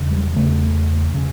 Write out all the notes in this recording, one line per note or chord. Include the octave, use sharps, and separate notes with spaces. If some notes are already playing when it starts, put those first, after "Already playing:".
Already playing: E2 C#3
G3
E2 C#3 A3
C#3